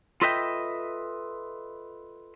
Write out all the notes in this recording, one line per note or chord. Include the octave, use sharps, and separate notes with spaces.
F4 A4 B4 D#5 E5 G5